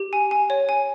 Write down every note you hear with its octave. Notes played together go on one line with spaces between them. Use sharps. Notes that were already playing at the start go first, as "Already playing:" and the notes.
Already playing: G4
G#5
G#5
C#5
G#5